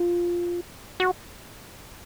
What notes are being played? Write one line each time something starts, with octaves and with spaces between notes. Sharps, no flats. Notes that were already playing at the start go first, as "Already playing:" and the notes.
Already playing: F4
F#4